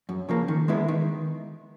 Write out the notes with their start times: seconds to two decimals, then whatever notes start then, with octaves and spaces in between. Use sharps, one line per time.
0.09 F#2
0.29 C#3 F3 A#3
0.48 D#3
0.68 G#3 B3 E4
0.88 D#3